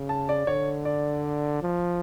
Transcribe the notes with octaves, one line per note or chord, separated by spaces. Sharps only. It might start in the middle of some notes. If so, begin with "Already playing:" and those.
Already playing: C#3
A5
D5
D3 C#5
D5
F3